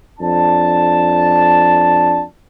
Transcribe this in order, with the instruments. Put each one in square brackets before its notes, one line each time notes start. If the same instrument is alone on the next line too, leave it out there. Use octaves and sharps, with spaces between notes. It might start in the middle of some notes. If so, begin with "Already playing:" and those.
[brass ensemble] F2 D4 A5